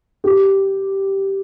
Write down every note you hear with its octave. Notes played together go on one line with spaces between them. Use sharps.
G4